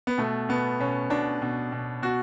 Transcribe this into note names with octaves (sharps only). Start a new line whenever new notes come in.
B3
B2 A3
B2 B3
B2 C#4
B2 D4
B2
B2
B2 F#4